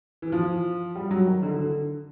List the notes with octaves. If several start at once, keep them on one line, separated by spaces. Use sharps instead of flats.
E3
F3
G3
F#3
D#3
D3
D3